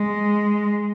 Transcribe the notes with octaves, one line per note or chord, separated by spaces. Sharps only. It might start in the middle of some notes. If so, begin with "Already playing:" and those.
Already playing: G#3